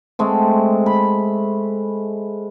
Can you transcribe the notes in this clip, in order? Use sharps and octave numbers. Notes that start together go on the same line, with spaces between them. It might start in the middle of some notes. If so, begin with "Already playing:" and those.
G#3 A3 C4
B5